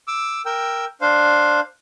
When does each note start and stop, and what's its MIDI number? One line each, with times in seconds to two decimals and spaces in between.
0.08 0.42 86
0.08 0.42 88
0.46 0.85 70
0.46 0.85 79
0.46 0.85 88
1.01 1.60 62
1.01 1.60 72
1.01 1.60 77